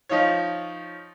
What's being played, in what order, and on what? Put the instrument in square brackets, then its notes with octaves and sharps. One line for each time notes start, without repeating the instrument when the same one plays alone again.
[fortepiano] F3 D#4 F4 C#5